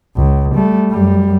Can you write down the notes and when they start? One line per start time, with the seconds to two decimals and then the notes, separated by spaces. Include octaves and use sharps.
0.16 C#2
0.55 G3 A3
0.91 F#2 G3